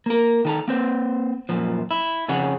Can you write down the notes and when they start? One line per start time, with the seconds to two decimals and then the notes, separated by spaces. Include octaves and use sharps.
0.06 A#3 A#4
0.45 D#3 A4 A#5
0.68 A#3 C4 C5
1.49 F#2 A#2 F3
1.91 E4
2.28 F2 C#3 C#4 G#4 C#5 F#5